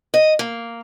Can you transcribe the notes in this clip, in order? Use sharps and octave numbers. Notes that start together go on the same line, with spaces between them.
D#5
A#3